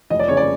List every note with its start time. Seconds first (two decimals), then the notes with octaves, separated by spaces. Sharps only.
0.10 F1 D#5
0.19 D5
0.28 C#3 C#5
0.37 D5